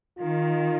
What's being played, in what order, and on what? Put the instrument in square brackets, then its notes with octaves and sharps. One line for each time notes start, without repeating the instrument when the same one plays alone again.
[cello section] D#3 [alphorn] F4